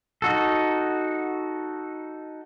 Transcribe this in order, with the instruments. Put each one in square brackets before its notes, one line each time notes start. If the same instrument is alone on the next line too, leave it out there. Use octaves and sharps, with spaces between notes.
[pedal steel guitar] D#4 F#4 A4